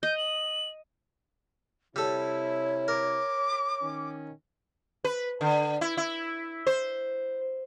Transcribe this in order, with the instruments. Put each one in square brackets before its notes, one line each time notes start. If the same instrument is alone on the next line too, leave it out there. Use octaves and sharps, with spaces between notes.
[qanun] D#5 [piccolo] G6
[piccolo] F#7
[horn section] C3 E4 [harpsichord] G3 A4 [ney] C#5
[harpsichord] A#4 [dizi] D6
[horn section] D#3 C#4
[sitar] B4
D3
E4
E4
C5